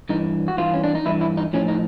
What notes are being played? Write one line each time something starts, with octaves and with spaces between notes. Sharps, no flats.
G2 E3 D#4
F#4
G2 E3 F4
C#4
D4
D#4
G2 E3 E4
E4
D#4
A2 F3 C#4
D#4